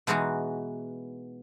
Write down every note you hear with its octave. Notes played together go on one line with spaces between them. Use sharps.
B2 E3 G#3 D#4 F#4